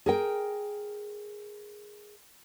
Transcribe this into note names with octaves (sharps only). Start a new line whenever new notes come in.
G#4 A#4 G5